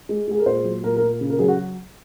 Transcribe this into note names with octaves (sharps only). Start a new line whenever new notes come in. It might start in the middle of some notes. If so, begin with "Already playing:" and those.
G#3
G#3 G#4
A#4
A#2 C5
F#3
A#2 A#4
A#4
A#2
C#3
A#4
F#3 G#4
F#4